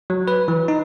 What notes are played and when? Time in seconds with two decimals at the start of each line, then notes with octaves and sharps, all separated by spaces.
0.10 F#3
0.28 B4
0.48 E3
0.68 D#4